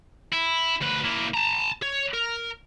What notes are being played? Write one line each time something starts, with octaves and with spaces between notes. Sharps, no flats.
E4
D2 B4
A#3 E4
A5 A#5
C#5
A#4